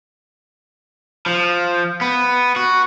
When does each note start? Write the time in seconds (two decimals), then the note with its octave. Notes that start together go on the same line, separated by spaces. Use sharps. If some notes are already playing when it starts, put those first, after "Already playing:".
1.26 F3
2.01 B3
2.56 F#4